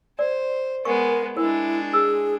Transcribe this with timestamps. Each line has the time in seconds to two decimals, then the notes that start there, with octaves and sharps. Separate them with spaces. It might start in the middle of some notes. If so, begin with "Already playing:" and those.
0.19 C5 D5
0.85 G#3 B3 A#4 C#6
1.37 G#3 D4 E4 A#4
1.93 G#4 E6